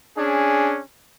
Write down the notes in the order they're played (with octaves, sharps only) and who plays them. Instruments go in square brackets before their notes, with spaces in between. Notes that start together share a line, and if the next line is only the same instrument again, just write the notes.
[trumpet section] C#4 D4 G#4